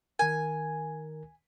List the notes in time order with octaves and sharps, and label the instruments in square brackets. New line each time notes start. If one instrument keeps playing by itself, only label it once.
[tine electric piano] D#3 A#4 [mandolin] G#5